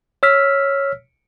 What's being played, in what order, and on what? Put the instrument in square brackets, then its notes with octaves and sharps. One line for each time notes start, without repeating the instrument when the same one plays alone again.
[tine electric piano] C#5 E6 F6 B6